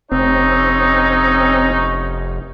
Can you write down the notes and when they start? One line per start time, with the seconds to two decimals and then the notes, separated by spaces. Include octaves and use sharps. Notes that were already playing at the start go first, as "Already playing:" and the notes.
0.12 F1 C4 C#4 D#4 C#5 D#5